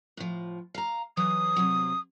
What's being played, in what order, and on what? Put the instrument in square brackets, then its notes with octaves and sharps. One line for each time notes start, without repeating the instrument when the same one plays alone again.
[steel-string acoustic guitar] A2 F3
F5 A#5
[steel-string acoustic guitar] E3 F#3 [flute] D#6
[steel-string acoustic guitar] C3 F#3